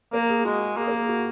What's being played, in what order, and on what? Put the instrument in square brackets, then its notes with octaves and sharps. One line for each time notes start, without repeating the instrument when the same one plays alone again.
[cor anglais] A#3 [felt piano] A#4
[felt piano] G#4
[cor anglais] G#3 [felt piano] F#4
[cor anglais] A#3 [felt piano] G#4
[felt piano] A#4
G#4
F#4